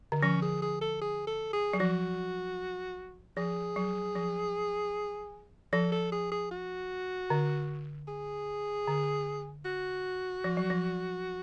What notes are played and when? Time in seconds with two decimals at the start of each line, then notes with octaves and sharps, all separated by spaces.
0.12 D3
0.23 F3 C#4
0.42 G#4
0.62 G#4
0.81 A4
1.01 G#4
1.27 A4
1.53 G#4
1.73 F#3
1.79 F3 F#4
3.37 F3 G#4
3.76 F#3
4.16 F3
5.73 F3 A4
5.92 A4
6.12 G#4
6.32 G#4
6.51 F#4
7.30 D3
8.08 G#4
8.88 D3
9.65 F#4
10.44 F3
10.57 F#3
10.70 F3